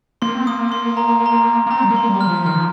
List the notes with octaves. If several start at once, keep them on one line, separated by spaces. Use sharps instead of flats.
A#3 C6
C4
A#3 D#6
C6
A#5
A#5
C6
A#3
C4 A#5
G3
A#3
C6
G3
F6
F3
D#3 F6
F3